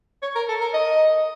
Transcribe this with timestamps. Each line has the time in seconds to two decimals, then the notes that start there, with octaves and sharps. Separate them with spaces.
0.22 C#5
0.36 A#4
0.49 A4
0.61 A#4
0.74 D#5